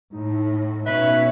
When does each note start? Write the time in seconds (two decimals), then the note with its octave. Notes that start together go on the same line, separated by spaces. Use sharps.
0.12 A2 D#4
0.86 B2 C#4 B4 C#5 E5